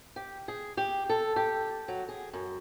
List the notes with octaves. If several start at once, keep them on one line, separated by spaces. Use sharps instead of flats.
G4
G#4
G4
A4
G4
F#3
G#4
F#2